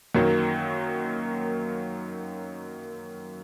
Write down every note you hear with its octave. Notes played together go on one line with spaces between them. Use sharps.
F#2 D#3 F#3 A#3